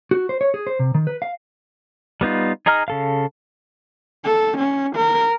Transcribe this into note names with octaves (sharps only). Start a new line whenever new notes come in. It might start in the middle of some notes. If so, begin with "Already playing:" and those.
F#4
C5
C#5
G#4
C5
C3
D#3
B4
F5
G3 B3 D#4 F4
D#4 G#4 D#5 A#5 F6
C#3 A4 F5
A4
C#4
A#4